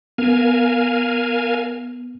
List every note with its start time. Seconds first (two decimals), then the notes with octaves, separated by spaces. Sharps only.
0.18 B3 A#4 F5 G#5